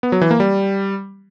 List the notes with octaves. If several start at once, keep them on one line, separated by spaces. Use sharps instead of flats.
B3
F#3
E3
A#3
G3